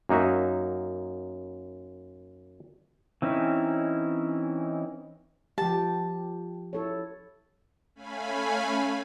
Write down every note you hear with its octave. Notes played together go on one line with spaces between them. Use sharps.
F#2 A#3 D#4 F#4 E5
E3 C4 C#4 D#4 E4
F3 G4 A5
E4 A4 C#5
A3 C#4 F5 G#5 B5